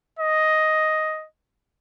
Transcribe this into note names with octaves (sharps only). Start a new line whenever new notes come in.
D#5